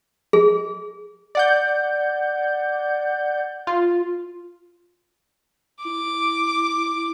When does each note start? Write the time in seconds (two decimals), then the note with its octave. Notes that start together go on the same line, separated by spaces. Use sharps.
0.33 G#4
1.35 D5 F#5 G6
3.67 F4
5.85 E4 D6